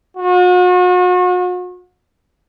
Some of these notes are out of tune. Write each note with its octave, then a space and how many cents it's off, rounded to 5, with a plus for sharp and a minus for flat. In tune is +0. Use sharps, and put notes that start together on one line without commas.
F#4 -40